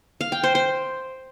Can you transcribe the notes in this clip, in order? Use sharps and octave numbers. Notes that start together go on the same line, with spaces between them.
F5
G5
C5
C5